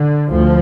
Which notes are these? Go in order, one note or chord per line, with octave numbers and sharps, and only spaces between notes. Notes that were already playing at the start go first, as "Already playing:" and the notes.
Already playing: D3
D2 F3